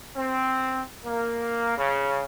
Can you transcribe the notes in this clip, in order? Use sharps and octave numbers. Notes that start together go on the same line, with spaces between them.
C4
A#3
C#3